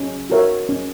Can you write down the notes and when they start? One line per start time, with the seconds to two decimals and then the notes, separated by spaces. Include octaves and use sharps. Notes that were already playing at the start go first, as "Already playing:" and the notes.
Already playing: C#4
0.30 F#4 A#4 C#5 E5
0.69 C#4